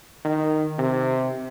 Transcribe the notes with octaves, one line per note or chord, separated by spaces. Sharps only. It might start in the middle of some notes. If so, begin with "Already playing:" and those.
D#3
C3